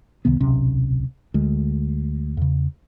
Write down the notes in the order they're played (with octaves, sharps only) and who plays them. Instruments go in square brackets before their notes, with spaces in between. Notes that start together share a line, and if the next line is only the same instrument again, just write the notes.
[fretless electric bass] C2 C3 D#3 B3
D1 B1 C3 C#4
D2 G#3
E2 C#3